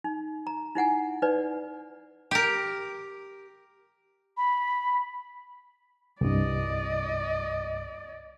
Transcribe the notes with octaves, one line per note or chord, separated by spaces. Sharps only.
D#4
A#5
D#4 E4 F#5 G#5
D#4 B4 D5
G4 A#4
B5
C2 G2 D5 D#5